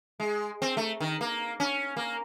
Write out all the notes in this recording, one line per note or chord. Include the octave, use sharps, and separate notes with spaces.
G#3
C4
A3
D#3
A#3
C#4
A#3